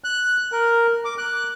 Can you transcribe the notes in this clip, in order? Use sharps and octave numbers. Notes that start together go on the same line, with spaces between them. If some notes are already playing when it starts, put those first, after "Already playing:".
F#6
A#4
D6
F#6